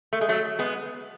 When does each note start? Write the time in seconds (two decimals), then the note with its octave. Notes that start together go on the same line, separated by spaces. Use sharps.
0.13 A3
0.21 G#3
0.29 F#3 A3
0.59 G#3 B3